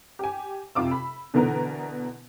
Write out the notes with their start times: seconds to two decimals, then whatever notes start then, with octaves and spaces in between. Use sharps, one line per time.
0.19 G4 G#5
0.75 F2 C3 F4 D6 E6
0.91 B5
1.34 B2 D3 E3 B3 A#4